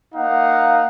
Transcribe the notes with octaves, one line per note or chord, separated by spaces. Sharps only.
A#3 D#4 F5 F#5